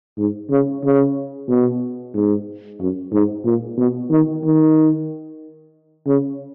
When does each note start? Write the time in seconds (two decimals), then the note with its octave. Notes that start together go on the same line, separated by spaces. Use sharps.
0.18 G#2
0.50 C#3
0.83 C#3
1.48 B2
2.14 G#2
2.80 F#2
3.13 G#2
3.45 A#2
3.78 B2
4.10 D#3
4.44 D#3
6.07 C#3